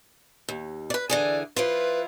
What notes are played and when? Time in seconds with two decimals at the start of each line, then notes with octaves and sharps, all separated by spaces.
0.49 D#2
0.90 B4 D5
1.10 D3 E3 G#4 D5
1.56 F3 E4 F4 B4